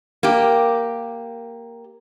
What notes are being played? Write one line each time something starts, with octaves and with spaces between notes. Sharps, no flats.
A#3 G4